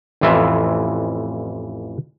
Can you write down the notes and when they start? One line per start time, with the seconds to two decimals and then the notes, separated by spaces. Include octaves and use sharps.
0.21 A1 F2 E3 F4 E5